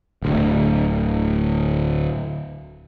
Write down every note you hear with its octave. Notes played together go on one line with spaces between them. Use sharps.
D1 D2